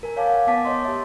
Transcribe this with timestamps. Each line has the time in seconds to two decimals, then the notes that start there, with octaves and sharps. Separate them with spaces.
0.03 A#4 G#5
0.16 C#5 F5 G#5 A5 D6
0.31 F#5
0.47 B3 F#5 A5 D6 B6
0.65 C#5 D#5 C6
0.85 G4 E5